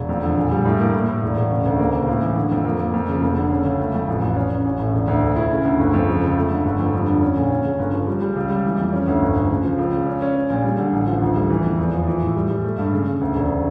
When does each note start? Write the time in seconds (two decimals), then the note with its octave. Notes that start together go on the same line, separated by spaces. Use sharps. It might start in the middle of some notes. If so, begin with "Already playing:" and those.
Already playing: E1
0.09 F2
0.23 D3
0.37 A#1
0.51 G3
0.65 A2
0.80 A#3
0.94 A2
1.08 A2
1.23 E1
1.37 E1
1.51 C#3
1.65 D2
1.79 A#3
1.94 C#2
2.08 A2
2.22 E3
2.36 D3
2.51 F2
2.65 A#3
2.79 A#3
2.93 F2
3.08 C#3
3.22 F1
3.36 D3
3.51 C#4
3.65 C#2
3.80 A3
3.94 F2
4.08 A1
4.22 A1
4.37 C#4
4.50 C#4
4.65 A1
4.79 A2
4.93 E1
5.08 D2
5.23 A3
5.36 E4
5.51 C#3
5.64 D2
5.79 G1
5.93 F2
6.08 C#3
6.22 C#2
6.36 A3
6.50 D3
6.65 G1
6.79 F2
6.93 G2
7.08 D3
7.22 C#4
7.36 A#1
7.51 C#4
7.64 C#3
7.79 G1
7.93 F3
8.07 G3
8.22 G3
8.36 C#2
8.50 G3
8.65 E3
8.79 F2
8.93 C#4
9.07 D2
9.22 G1
9.36 G1
9.50 C#3
9.64 F3
9.78 C#2
9.93 C#3
10.07 C#4
10.22 C#4
10.35 C#4
10.50 A#1
10.64 G3
10.78 D3
10.92 A1
11.07 F3
11.22 D2
11.36 G3
11.50 E3
11.64 F2
11.78 E2
11.93 F3
12.07 E3
12.21 A2
12.36 G3
12.50 G3
12.64 A3
12.78 G2
12.93 C#3
13.07 C#3
13.21 D2
13.35 E1